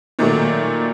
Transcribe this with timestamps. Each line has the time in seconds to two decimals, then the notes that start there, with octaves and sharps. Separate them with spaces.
0.19 A#2 D#3 F#3 A3